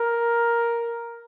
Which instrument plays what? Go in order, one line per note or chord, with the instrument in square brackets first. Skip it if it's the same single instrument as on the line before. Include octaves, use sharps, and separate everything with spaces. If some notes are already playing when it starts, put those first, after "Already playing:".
Already playing: [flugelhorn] A#4